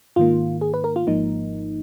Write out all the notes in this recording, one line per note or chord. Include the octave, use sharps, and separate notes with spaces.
G#2 D#3 A#3 F4
G#4
B4
A#4
F4
G#1 G#2 F3 A#3 D#4